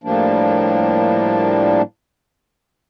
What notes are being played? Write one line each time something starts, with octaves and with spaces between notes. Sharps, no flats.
A2 F3 G3 A#3 D4